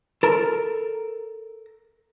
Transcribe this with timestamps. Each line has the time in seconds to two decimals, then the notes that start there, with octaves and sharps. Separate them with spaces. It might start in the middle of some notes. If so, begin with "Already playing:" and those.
0.23 A4 A#4